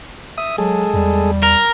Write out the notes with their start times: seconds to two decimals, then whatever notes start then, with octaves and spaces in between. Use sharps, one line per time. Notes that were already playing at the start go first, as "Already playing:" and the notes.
0.38 E5 D#6
0.58 F#3 G#3 G#4 A4
0.94 E2 G3
1.43 A#4